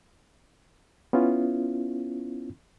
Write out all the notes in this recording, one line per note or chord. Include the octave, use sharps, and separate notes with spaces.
B3 C#4 E4 F4